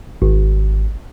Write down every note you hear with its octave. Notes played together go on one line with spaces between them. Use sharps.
G#1